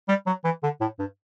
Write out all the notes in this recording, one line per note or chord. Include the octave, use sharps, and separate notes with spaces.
G3
F#3
E3
D3
A2
G2